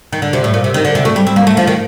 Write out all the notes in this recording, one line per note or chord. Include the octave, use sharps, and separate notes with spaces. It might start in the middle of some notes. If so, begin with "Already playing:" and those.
D#3
D3
C3
A2
A#2
C3
D#3
D3
C3
A3
G3
C4
A#3
A3
F3
D#3